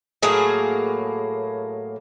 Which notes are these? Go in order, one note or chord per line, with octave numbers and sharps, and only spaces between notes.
A2 F#3 A#3 G#4